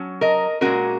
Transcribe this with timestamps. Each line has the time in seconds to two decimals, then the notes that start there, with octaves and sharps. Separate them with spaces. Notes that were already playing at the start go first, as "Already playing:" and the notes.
Already playing: F#3 C#4
0.21 A#4 D#5
0.61 A#2 G#3 C#4 F#4 A#4